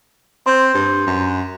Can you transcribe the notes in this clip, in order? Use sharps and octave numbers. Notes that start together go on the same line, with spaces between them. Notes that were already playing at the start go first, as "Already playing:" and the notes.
C4 C6 G6
G2
F#2